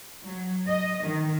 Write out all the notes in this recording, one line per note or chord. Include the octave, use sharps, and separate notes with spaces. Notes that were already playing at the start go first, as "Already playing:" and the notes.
F#3
D#5
D#3